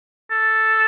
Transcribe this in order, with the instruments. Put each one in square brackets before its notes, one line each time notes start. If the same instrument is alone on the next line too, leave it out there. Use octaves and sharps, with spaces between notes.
[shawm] A4